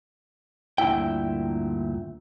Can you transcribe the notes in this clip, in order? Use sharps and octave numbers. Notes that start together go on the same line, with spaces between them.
D2 G2 A#2 E4 G5